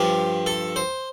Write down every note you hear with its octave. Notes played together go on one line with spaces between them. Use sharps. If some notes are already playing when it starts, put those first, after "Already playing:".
Already playing: G2 F3 G4
A4
C5